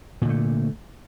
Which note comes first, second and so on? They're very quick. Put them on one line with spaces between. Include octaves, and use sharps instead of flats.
A#2 D3 A3